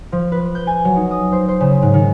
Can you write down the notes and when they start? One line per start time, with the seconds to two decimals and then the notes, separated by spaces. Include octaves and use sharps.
0.12 F3
0.32 B4
0.55 G6
0.67 G#5
0.85 F#3
0.96 D#4
1.11 D#6
1.32 C5
1.48 C5
1.60 C#3
1.82 G#2
1.94 D#3